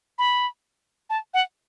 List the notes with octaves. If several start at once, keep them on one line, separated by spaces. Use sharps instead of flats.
B5
A5
F#5